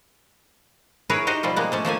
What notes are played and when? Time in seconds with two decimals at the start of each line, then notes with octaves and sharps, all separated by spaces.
1.10 E4 G#4 A#4 B4 C#5
1.27 D#4 F#4 G4 C5 D#5
1.43 B2 F3 G3 F4
1.56 G#3 A#3 B3
1.72 F3 A3 C#4
1.85 F3 A3 A#3 G#5